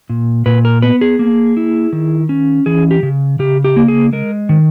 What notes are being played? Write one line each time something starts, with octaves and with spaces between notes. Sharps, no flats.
A#2
A#2 B4
A#4
B3 B4
G#4
A#3
E4
D#3
C#4
E3 G#4
G4
C#3
C#3 G4
G4
A#3
G#4
G#3 A#4
D#3